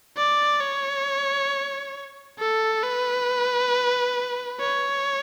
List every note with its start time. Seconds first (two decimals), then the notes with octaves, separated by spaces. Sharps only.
0.17 D5
0.60 C#5
2.39 A4
2.83 B4
4.60 C#5